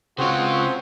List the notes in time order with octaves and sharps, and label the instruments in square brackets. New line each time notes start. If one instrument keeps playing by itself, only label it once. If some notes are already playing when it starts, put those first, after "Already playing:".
[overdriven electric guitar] C#3 F4 [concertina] C4 C5 C#5 [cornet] F#4